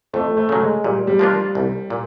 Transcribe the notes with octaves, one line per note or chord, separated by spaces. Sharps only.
F2 A3
A3
C#3 F#3
G#3
A#2 G3
G3
F3 A#3 D4 F4
C2
A#2